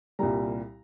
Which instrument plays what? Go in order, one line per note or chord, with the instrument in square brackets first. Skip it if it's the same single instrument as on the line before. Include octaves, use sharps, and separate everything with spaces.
[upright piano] C2 A#2 G3 A#5